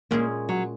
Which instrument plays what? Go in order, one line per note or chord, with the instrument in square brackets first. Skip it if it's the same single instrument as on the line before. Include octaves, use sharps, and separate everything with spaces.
[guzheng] A#2 G#3 C#4 G#4 [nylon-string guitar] A#3
[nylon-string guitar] F#3